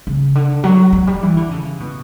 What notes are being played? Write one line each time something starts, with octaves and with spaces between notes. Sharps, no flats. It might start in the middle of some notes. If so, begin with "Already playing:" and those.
C#3
D3
F#3
F#3
G3
E3
D3
C#3
B2